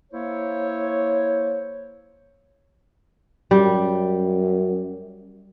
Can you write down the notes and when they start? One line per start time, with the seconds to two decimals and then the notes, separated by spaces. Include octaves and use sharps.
0.12 A#3 E4 C5 C#5
3.51 F#2 G3